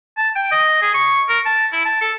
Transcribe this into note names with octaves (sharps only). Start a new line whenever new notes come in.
A5
G5
D#5
G#4
C#6
A#4
A5
E4
A5
A4